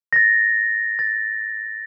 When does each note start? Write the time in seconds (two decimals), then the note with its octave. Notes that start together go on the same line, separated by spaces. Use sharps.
0.13 A6 A#6
0.99 A6